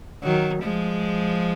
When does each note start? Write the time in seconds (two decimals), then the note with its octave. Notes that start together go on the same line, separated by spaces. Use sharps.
0.23 D#3 F#3
0.63 F3 G#3